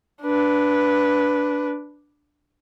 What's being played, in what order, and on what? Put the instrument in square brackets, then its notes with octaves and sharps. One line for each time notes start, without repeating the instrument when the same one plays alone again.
[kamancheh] D4 B4